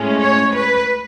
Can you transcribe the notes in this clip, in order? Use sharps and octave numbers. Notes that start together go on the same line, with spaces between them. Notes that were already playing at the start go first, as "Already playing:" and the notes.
Already playing: A2 G#3 C#4
C#5
B4